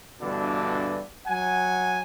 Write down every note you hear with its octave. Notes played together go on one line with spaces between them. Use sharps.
G2 B2 D3 E3 D4
F#3 F#5 G#5